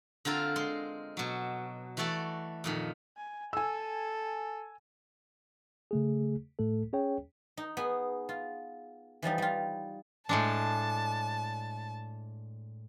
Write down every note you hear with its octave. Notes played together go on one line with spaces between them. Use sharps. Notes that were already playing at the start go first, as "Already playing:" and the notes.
D3 C4 F4 A#4
G#3 C6
B2 F#3
E3 A3 F#4 A4 D5
F2 A#2 D#3
G#5
A4 G#5 E6
C#3 A3 G#4
A2 A3 A4
C#4 G#4 C#5 G5
D#4
B3 G#4
F4
E3 F3 G3 D#4
G3 F4
A2 G#3 D4 A5